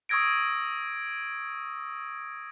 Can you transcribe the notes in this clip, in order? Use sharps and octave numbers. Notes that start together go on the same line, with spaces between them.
C#6 D#6 E6 G#6 A#6 D7